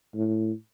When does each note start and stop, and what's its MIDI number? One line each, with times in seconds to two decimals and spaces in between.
0.15 0.52 45